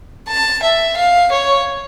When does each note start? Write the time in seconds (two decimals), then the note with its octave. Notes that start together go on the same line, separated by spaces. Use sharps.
0.28 A5
0.63 E5
0.97 F5
1.31 C#5